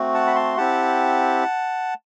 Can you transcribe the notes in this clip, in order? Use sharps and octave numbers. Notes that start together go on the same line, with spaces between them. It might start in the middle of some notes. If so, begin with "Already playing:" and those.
Already playing: A3 C4 F#4
F#5 A5
B5
A5 C6
C4 E4 G4 F#5 A5